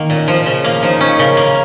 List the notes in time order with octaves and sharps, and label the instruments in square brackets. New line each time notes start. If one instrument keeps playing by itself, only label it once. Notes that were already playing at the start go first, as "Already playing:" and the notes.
Already playing: [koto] D#3 A#3
[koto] A#2 [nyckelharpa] C#4
[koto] F3
C#3
A#3
[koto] F3 [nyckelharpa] D#4
[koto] C#4
[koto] C#3 [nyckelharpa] A#4
[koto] A#3